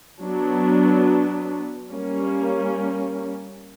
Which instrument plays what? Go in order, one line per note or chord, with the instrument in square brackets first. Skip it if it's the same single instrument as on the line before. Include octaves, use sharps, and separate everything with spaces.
[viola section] F#3 B3 D4
G3 A#3 C#4